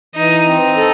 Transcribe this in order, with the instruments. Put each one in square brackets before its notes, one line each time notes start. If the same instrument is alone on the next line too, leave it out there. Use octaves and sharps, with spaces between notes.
[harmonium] E3 [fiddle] D#4
[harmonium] C4
A4